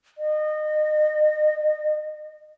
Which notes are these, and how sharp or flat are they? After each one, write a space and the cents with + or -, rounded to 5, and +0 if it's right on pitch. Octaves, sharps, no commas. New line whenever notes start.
D#5 -30